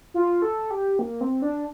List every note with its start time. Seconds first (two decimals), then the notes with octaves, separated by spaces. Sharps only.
0.14 F4
0.42 A4
0.71 G4
0.99 A#3
1.21 C4
1.42 D4